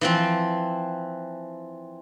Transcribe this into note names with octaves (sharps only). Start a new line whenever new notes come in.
E3 F3 C4